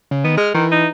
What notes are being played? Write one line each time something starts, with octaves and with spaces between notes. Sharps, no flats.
C#3
D#3 B3
G#3 F6
D#3 E3
D#4